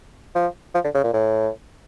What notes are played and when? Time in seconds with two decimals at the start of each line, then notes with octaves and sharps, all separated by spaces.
0.35 F3
0.75 F3
0.84 D3
0.95 C#3
1.04 A#2
1.13 A2